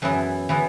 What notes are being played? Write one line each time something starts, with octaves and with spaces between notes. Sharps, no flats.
F#2 E3 B3 E4
E3 B3 E4